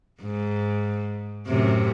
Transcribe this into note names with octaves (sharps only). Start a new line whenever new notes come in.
G#2
F#2 A2 C3